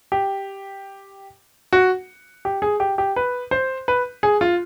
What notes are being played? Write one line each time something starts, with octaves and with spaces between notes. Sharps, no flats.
G4
F#4
G4
G#4
G4
G4
B4
C5
B4
G#4
F4